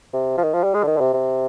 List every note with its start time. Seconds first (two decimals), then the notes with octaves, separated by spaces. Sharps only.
0.13 C3
0.38 F3
0.43 D#3
0.53 F3
0.64 G3
0.74 G#3
0.83 D3
0.87 D#3
0.97 D3
1.00 C3
1.14 C3